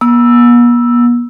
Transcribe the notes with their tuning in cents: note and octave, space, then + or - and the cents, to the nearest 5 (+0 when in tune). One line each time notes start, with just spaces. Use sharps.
B3 -45 E6 +0